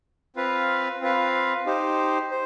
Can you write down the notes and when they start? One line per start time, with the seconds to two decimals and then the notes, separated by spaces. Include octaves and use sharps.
0.36 C4 F4 B4 F5
1.01 C4 F4 B4 F5
1.66 D#4 G4 C5
2.31 C5